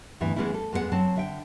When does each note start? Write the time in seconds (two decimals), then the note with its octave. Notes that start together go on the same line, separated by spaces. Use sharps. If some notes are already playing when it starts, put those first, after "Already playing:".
0.20 D2 G2 E3 B3 E5
0.36 E3 G#3 A3 B3 C#4 E4
0.54 A4
0.73 F2 G#3 B3 G4 F#5
0.92 F#3 C4 A5
1.16 D3 E5 G5